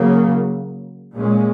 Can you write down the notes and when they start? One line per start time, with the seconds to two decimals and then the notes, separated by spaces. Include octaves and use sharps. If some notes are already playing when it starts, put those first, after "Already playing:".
Already playing: C#3 F#3 A#3
1.13 A#2 G#3 C#4